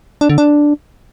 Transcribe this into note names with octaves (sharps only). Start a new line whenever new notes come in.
D4
D3
D4